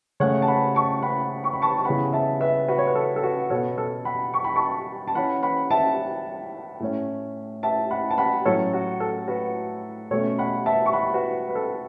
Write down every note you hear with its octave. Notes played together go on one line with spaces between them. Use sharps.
C#3 A3 C#4 C#5 F#5
A5
F#5 B5
A5 C#6
F#5 B5
C#6
B5
A5 C#6
C#6
C#3 E3 B3 F#5 B5
E5 A5
B4 E5
F#4 B4
C#5
B4
A4
A4
F#4 B4
B2 B3 A4 C#5
A4
F#5 B5
C#6
B5
A5 C#6
A5
E3 C#4 F#5 B5
F#5 B5
E5 A5
A2 A3 C#4
E5 A5
F#5 B5
A5
F#5 B5
A2 F#3 C#4 A4 C#5
F#4
A4
F#4 B4
B2 A3 C#4 A4 C#5
F#5 B5
E5 A5
C#6
F#5 B5
F#4 B4
B4
A4